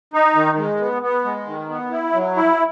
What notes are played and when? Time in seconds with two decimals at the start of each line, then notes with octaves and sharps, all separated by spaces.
0.14 D#4
0.35 D#3
0.57 G#3
0.80 B3
1.02 B3
1.24 G#3
1.47 D#3
1.69 B3
1.91 E4
2.13 F#3
2.36 E4